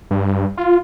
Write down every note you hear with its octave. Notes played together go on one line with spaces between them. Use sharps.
G2
F4